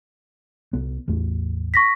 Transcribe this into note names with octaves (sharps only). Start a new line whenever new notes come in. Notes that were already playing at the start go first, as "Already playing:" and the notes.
C2 B3
A1 E2 A3
C#6 A#6 B6